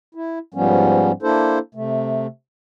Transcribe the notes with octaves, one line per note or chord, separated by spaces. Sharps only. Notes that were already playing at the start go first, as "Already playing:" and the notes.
E4
G#2 F3 G3 B3 C#4
A#3 D4 E4 A4 C5
C3 A3